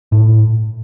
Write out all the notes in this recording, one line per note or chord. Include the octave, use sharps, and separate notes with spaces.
A2